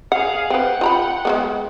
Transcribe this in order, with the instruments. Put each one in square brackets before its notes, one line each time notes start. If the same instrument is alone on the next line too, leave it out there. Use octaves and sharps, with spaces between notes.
[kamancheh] G#4 F5 [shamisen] F#5
[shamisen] C4 B4 [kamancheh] F#5 G5
[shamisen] F4 A#5 B5
G#3 A#3 B3